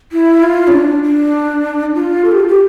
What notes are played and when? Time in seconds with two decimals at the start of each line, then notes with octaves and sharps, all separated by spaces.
0.12 E4
0.43 F4
0.67 C#4
0.72 D4
1.03 D4
1.95 F4
2.25 A4
2.32 G4
2.39 F4
2.48 G4